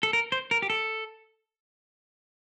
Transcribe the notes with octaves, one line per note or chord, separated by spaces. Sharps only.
A4
A#4
C5
A#4
G4
A4